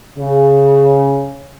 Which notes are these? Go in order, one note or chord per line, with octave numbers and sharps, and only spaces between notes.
C#3